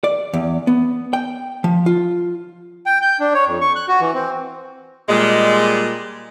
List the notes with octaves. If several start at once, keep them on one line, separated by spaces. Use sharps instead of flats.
D5
E2
B3
G5
F3
F4
G5
G6
D4
C#5
F2
C#6
F#6
F#4
E3
C4
A#2 G3 G#3